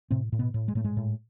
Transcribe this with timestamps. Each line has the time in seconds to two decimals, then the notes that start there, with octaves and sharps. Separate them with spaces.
0.11 A2 C3 C4
0.32 A2
0.39 B2 B3
0.54 A2
0.68 G#3
0.75 A2 A3
0.84 G#2 G#3
0.97 A2